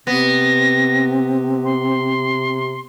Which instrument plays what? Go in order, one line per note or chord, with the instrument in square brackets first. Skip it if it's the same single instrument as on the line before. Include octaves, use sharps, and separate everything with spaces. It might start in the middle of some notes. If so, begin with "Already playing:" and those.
[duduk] C3 [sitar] B3 [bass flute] C4 [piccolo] A#6
[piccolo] C6